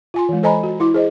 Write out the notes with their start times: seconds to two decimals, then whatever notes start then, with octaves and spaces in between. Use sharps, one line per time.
0.14 F4 G#5 C6
0.29 E3 G#3
0.43 A4 C5 D#5 G#5 A#5 B5
0.63 F#4
0.80 E4 C6 D6
0.94 G#4 C5 D#5